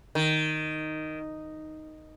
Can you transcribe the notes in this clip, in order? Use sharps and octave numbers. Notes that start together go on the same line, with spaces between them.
D#3